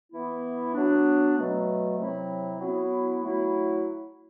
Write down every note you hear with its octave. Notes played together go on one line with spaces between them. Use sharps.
E3 B3 E4
F#3 B3 D4
B2 F#3 A3
C3 F#3 C4 E4
F#3 B3 E4
F#3 A3 E4